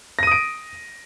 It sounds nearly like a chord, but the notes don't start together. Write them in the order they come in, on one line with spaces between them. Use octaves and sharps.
A#6 D#7 D#6 D7